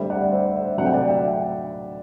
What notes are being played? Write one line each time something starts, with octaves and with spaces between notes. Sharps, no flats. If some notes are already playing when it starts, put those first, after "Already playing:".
Already playing: D2 D3 G3 C5 E5
D5 F#5
C5 E5
C5 E5
D2 C3 F#3 A3 D4 F#5
G5
D5 F#5
E5 G5